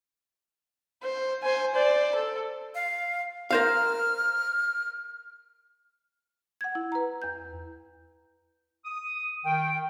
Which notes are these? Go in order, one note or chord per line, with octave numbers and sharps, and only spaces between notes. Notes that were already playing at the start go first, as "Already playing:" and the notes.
C5
C5 G#5
C5 D5
A4
F5
A#4 C5 F5 F6
F#5 G#6
E4
B4 A#5
E2 G6
D#6
D#3 G5